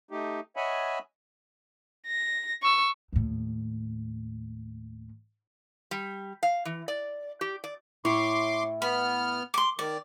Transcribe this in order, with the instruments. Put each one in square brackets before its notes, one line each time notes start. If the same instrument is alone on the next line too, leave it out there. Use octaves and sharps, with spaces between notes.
[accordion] A3 D#4 G4
C#5 D#5 E5 F#5 G#5 B5
[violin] A#6
C#6 E6
[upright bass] D#2 A2
[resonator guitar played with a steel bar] G3
F5
E3
D5
G4
D5
[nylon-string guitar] A2 E4 [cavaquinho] C#5 [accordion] C6 D6
[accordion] B3 F6 [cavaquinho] B5
[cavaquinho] C6 D6
[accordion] D#3 [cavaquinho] D5